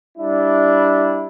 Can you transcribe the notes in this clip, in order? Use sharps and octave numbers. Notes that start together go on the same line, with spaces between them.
G3 D4 E4